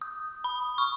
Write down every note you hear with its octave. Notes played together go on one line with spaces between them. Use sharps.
D#6
B5
C#6